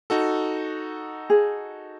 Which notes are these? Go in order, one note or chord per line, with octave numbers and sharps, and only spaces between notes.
D#4 F#4 A4
G#4